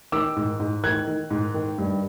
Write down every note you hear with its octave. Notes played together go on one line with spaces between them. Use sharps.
D#3 D6 E6
G#2
G#2
D#3 F#6 G#6
D#3
G#2
D#3
G2